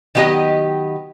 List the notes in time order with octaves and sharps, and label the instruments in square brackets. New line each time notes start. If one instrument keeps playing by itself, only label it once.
[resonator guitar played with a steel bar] D#3 F#3 B3 G4 D#5